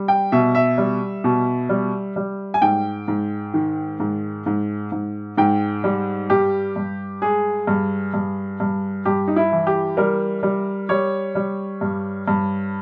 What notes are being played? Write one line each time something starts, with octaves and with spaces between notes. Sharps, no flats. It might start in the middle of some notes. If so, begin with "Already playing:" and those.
Already playing: G3
G5
B2 E5
E5
G3
B2
G3
G3
G#5
G#2 G5
G#2
D#3
G#2
G#2
G#2
G#2 G5
G3
G2 G4
G2
G#3 G#4
G2
G2
G2
G2 G4
D#4
E4
E3
G4
G3 A#4
G3
G3 C#5
G3
G2
G2